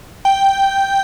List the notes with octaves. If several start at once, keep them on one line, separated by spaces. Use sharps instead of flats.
G5